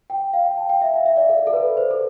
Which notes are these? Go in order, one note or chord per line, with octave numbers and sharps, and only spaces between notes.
G5
F5
G5
A5
G5
E5
F5
E5
D5
A4
A4
B4
C5
A4